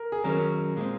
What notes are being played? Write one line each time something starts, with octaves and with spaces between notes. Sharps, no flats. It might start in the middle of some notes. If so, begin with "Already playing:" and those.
Already playing: A#4
G#4
D#3 F#3 C#4 A#4
A#2 G#3 C4